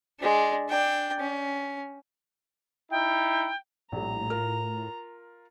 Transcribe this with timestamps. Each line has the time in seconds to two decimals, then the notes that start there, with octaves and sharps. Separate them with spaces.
0.20 G#3 D4
0.69 D4 G5
1.19 C#4
2.91 D#4 E4 G5
3.92 A#1 A2 G3 A#5
4.30 F4 A#4 F6